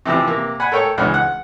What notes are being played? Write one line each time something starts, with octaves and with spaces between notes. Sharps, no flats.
C3 E3 F3 C4
C3 A#3
F#5 G#5 B5
A4 A#4 C#5 G5
C#2 E3 C#4 D4
F#5